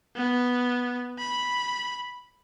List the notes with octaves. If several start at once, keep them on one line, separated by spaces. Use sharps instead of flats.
B3
B5